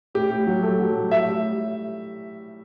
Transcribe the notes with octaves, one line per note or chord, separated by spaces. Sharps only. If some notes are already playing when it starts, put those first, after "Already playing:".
A2 G4
A2
F#3
A3
F#3
A2
A2 E5
G3